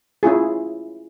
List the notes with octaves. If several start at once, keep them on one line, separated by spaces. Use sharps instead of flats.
C#4 E4 F4 G#4